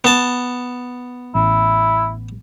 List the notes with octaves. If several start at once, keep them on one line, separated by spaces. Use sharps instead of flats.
B3 A5
A1 E4